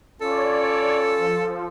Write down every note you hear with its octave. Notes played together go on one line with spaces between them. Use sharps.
C#4 F4 A4 C#5 D5
F3